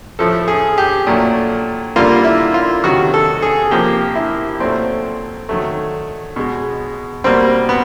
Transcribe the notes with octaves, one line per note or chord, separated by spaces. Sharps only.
A2 F3 A3 A4
G#4
G4
A#2 F#3 A3
D3 G3 A#3 F4
E4
F4
C3 D#3 F#3 F#4
A4
G#4
C3 F3 A#3 G4
E4
A#2 F#3 A3 C4
D#3 F#3 A3
B2 G#3
B2 G3 A#3 C4
B3